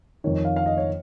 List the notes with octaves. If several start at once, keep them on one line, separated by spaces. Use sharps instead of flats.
F2 D#3 C#5
C#5
F5
F5
D#5
C#5